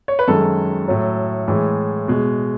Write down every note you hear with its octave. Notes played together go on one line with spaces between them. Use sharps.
C#5
B4
F#2 D#3 G#3 A4
A2 F#3
A2 E3 G#3
B2 G#3